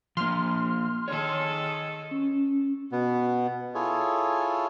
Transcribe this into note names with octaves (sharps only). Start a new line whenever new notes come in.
F3 A#3 C6 F6
D#3 G#4 A4 C#5
C#4
B2 B3
E4 F4 G#4 A4 C#5